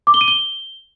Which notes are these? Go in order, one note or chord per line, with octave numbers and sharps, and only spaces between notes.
D6
G7
D#7
G7